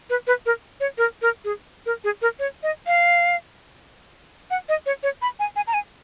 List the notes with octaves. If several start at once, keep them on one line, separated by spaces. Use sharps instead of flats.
B4
B4
A#4
C#5
A#4
A#4
G#4
A#4
G#4
A#4
C#5
D#5
F5
F#5
D#5
C#5
C#5
B5
G#5
G#5
A#5
G#5